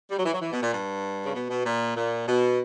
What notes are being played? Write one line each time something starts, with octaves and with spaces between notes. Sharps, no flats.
G3
F#3
E3
F#3
E3
B2
A#2
G2
C#3
B2
B2
A#2
A#2
B2